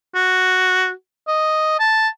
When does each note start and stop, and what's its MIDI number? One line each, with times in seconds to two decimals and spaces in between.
0.15 0.90 66
1.28 1.75 75
1.80 2.08 81